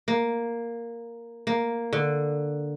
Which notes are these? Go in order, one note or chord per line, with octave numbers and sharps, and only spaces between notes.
A#3
A#3
D3